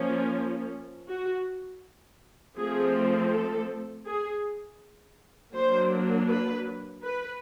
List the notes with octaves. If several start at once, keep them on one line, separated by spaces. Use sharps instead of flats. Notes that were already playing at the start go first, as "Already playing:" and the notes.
Already playing: F3 A#3 C#4
F#4
F3 A3 C4 G#4
A4
G#4
F#3 A#3 D4 C5
B4
B4